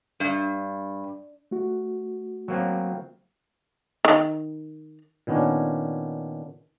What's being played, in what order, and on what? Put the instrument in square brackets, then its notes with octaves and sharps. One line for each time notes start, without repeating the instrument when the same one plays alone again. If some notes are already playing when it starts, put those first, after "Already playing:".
[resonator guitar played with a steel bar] G2
[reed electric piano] A3 F#4
[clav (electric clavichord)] F#3 A#3 C4
[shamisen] D#3
[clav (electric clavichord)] A#2 D#3 B3 C#4 D4